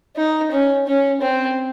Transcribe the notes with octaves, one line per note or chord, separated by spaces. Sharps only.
D#4
C#4
C#4
C4